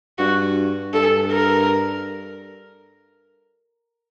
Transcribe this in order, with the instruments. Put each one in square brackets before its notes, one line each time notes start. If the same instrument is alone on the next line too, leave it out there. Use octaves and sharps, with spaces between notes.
[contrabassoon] G2 [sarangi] F#4
[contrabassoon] G2 [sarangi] A4
[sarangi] A#4